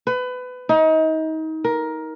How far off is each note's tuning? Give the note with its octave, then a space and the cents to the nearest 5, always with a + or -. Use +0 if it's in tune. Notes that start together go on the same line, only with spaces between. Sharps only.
B4 +25
D#4 +30
A#4 +15